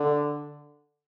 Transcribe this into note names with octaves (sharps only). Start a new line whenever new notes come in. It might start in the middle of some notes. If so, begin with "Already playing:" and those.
Already playing: D3